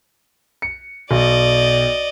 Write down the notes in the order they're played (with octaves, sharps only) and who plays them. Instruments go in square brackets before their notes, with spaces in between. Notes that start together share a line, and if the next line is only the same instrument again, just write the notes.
[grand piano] C#7
[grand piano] B1 [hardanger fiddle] D5 D#5